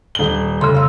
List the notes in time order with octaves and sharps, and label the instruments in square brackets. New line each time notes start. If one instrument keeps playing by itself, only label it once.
[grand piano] D#1 G7
[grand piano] F1 [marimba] C#3 C6
[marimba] F5 E6